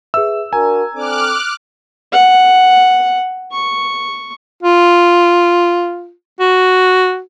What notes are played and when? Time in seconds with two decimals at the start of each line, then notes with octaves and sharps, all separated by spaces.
0.14 G#4 B4 E5 E6
0.53 D4 F#4 A#4 G#5 A#5
0.95 C4 D4 A4 D6 F6 F#6
2.12 F#5
3.52 C#6
4.63 F4
6.40 F#4